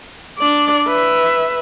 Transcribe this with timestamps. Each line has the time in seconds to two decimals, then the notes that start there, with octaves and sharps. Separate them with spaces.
0.39 D4 D5
0.87 B4 E5